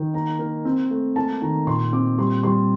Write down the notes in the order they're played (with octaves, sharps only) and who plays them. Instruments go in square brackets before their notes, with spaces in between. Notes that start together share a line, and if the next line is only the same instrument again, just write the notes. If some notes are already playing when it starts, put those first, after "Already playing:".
Already playing: [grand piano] D#3
A#3 A#5
A#3
C4
A3
A#3 A5
D#3 A#5
A#2 C6
C4 D6
G3 C6
G3 C6